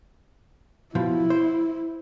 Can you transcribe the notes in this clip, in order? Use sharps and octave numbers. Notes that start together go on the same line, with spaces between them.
B2 F3 E4
C5